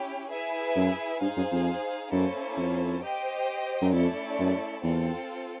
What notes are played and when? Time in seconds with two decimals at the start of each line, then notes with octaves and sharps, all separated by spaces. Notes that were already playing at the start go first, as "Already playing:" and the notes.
Already playing: C#4 E4 G4
0.31 E4 G#4 B4 E5 G#5
0.76 F#2
1.21 G2 D#4 G#4 C5 F5
1.37 F#2
1.52 F2
2.12 F#2 A#3 C#4 E4 A4 C5
2.57 F2
3.02 G4 C5 D#5 G5
3.82 F#2
3.93 F2 A3 C#4 E4 A4 D5
4.39 F#2
4.84 E2 C4 F4 A4